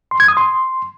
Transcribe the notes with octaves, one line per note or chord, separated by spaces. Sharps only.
C6
G#6
D#6
C6